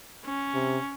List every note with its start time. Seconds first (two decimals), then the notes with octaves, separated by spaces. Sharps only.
0.25 C#4
0.54 C3